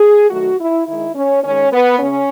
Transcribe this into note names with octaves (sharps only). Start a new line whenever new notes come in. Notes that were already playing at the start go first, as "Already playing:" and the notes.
Already playing: G#4
D#3 F#3 A3 F#4
E4
D#3 G#3 E4
C#4
D#3 G#3 C#4
B3
C#3 C#4